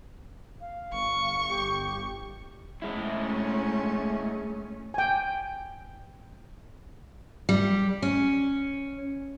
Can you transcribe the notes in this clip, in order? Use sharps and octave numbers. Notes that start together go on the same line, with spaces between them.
F5
G1 C#6
G4
G#3 A3 C#4 E4
G5 G#5
G3
C#4